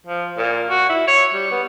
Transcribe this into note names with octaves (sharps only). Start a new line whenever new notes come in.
F3
A#2
F#4
E4
C#5
G3
B3